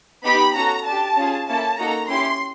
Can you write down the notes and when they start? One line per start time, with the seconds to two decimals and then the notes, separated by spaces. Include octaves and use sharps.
0.24 B3 D#4 G4 B5
0.54 C#4 F#4 A4 A#5
0.86 D4 G4 A5
1.17 C#4 F4 G#4
1.47 A#3 C#4 E4 A4 A5
1.78 A#3 D#4 F#4 A4 A#5
2.09 C#4 E4 G4 C6